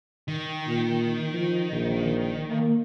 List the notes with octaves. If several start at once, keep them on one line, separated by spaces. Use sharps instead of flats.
D#3
A#2
F3
A#1
A#3